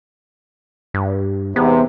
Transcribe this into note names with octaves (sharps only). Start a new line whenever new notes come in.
G2
E2 G#2 C3 B3